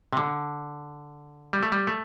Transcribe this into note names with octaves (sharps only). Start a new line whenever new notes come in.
C3
D3
G3
A3
G3
A3